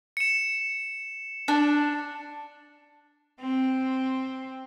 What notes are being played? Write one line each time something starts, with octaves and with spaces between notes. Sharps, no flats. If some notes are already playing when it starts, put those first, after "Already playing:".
C#7 E7
D4
C4